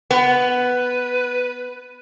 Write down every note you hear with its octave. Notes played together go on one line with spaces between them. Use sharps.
B3 B4